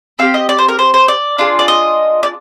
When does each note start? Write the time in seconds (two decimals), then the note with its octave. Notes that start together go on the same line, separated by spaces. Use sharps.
0.19 C4 G4 F5
0.34 D#5
0.49 D5
0.58 C5
0.68 A#4
0.79 C5
0.94 C5
1.08 D5
1.38 D4 F4 G#4
1.59 D5
1.68 D#5
2.23 D5